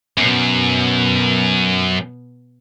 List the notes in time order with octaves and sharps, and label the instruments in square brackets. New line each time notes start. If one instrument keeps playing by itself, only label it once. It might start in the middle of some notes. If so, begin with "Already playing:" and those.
[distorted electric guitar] F#2 [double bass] B2